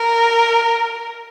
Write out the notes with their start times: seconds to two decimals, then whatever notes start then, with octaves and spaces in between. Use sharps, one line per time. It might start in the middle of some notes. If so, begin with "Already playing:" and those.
Already playing: A#4